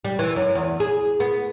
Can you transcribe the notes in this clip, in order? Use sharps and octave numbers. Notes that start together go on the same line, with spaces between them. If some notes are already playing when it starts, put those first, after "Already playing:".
G3
E3
F#2
E2
G#4
B3